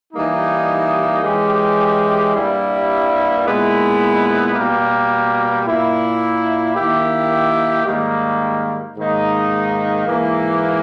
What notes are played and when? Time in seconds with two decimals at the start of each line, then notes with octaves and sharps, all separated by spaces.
0.13 E3 G3 A#3 D#4
1.24 E3 G#3 C#4 G4
2.35 G2 G3 A#3 E4
3.45 A#2 G#3 B3 E4
4.55 B2 G3 A#3
5.65 A#2 A#3 E4
6.75 D#3 A#3 E4 G4
7.86 G#2 D#3 G3 A#3
8.96 G#2 D#3 A#3 D#4
10.06 G#2 E3 A#3 E4